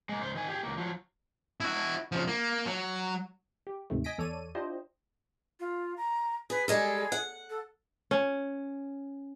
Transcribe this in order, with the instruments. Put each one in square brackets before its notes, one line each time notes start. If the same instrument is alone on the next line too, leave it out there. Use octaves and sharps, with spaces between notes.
[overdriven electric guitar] G#3 A#3
C#2 C5
D#3 G#5
G4 G#4
C#2 A#3
F3 F#3
[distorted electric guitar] E4 F#4
C#3 F3
A#3
F#3
[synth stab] G4
D#2 G#2 C3 D#3 A3
D#5 G#5 A#6 B6 D7
E2 A4 C#5 D5 D#7
D4 E4 F4 G4 C5 D#5
[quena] F4
A#5
[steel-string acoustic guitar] G#4 [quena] B4
[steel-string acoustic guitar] G3 G#3 A4 [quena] G#4
[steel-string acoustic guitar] F#5
[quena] A4
[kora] C#4